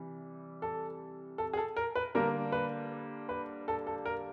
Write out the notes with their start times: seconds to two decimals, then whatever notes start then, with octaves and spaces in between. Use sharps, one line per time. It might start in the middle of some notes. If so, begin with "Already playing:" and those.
Already playing: C3 E3 G3
0.62 A4
1.38 A4
1.53 G#4
1.57 A4
1.77 A#4
1.95 B4
2.15 D3 G3 A#3 D4 A#4
2.52 B4
3.29 B4
3.68 A4
3.87 A4
4.06 A#4